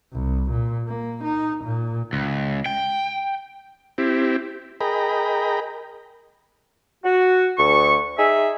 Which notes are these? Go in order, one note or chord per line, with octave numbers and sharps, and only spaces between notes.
C2
A#2
A#3
D#4
A#2
C#2
G5
C4 E4 G4
G#4 A#4 D#5 G5 A#5 B5
F#4
D2 C#6
D#4 G#4 E5